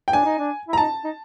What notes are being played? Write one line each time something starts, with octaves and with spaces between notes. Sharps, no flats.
G5
D4 G#5
D#4
D4
E4
A#5
D#4 A5
D#4